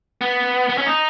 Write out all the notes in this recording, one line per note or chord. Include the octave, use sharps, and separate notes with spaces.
B3
B3
C#4
D#4